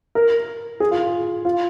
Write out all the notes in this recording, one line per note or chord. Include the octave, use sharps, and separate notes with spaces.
A#4
G#4
F4
F4